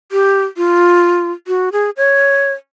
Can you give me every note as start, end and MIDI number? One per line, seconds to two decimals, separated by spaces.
0.12 0.45 67
0.57 1.32 65
1.47 1.69 66
1.72 1.90 68
1.97 2.53 73